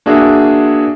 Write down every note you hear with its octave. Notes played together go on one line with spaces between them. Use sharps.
A#3 D4 F#4 G#4 E5